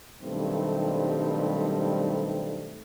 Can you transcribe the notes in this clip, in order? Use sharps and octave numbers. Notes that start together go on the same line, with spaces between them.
B1 G2 D#3 G3 A3 C4